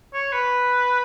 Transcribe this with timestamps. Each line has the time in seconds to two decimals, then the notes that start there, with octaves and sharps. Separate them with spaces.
0.14 C#5
0.33 B4